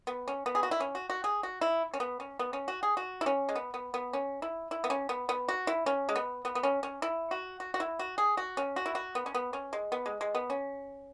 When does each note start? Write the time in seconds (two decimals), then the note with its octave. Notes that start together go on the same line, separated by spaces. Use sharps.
0.07 B3
0.28 C#4
0.46 B3
0.55 G#4
0.63 F#4
0.71 E4
0.80 C#4
0.95 F#4
1.10 F#4
1.24 G#4
1.43 F#4
1.61 E4
1.94 C#4
2.00 B3
2.20 C#4
2.39 B3
2.53 C#4
2.68 F#4
2.83 G#4
2.97 F#4
3.21 E4
3.26 C#4
3.49 G#3
3.56 B3
3.74 B3
3.94 B3
4.13 C#4
4.42 E4
4.71 E4
4.84 B3
4.90 C#4
5.09 B3
5.29 B3
5.49 F#4
5.67 E4
5.86 C#4
6.09 G#3
6.16 B3
6.45 B3
6.55 B3
6.63 C#4
6.83 C#4
7.02 E4
7.31 F#4
7.60 F#4
7.74 F#4
7.80 E4
7.99 F#4
8.18 G#4
8.37 F#4
8.57 C#4
8.76 F#4
8.86 E4
8.95 F#4
9.15 B3
9.26 C#4
9.35 B3
9.53 C#4
9.73 G#3
9.92 B3
10.06 G#3
10.21 G#3
10.35 B3
10.50 C#4